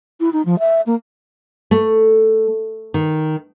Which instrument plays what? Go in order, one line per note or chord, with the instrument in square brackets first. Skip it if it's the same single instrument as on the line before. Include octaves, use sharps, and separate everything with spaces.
[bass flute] E4
D#4
F3
E5
A#3
[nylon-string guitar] A3
D#3